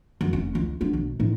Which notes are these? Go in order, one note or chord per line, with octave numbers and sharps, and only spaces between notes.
F#2
F1 C#4
C#2
F#3 D4
B1
A2 D#4